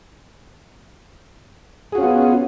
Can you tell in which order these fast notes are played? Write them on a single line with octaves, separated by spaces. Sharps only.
G#4 F#4 C#4 F4 B3